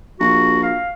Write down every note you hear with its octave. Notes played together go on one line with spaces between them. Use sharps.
A#1 F#4
F5